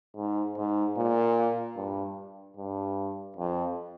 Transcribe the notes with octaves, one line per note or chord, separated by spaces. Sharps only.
G#2
G#2
A#2
G2
G2
F2